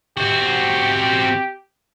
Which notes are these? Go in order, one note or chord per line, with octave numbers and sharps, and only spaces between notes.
C4 F#4 G4